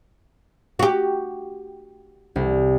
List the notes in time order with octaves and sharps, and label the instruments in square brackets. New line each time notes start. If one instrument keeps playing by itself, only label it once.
[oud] F#4 G4
[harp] C2